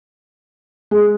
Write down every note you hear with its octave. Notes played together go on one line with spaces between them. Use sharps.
G#3